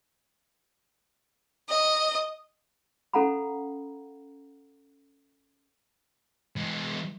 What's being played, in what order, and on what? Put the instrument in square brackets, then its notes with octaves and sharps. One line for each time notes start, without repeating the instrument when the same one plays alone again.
[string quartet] D#5
[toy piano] C#4 A4 F5 F#5 A#5 B5
[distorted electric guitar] E3 G#3